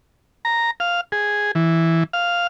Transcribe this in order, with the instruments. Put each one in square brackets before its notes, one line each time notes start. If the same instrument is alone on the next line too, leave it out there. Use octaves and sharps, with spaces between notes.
[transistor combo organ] A#5
F5
G#4
E3
F5